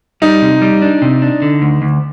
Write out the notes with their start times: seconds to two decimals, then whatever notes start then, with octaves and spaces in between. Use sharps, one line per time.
0.22 G3 D#4
0.42 C3
0.62 G3
0.82 D4
1.02 C3
1.22 D4
1.42 D3
1.62 D2
1.82 D2